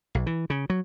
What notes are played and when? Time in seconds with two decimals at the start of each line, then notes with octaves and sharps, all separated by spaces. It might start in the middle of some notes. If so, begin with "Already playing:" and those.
0.15 B1
0.26 E3
0.50 C#3
0.70 F#3